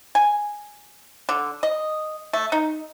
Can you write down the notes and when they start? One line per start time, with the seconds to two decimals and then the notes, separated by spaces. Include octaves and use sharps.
0.15 G#5
1.29 D3
1.63 D#5
2.33 A3
2.52 D#4